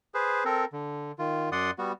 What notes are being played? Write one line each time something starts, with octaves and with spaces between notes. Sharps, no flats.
G#4 B4 C5
C4 A4 A#4
D3
D#3 F4
F#2 D5 F#5 C6 D#6
G3 B3 F#4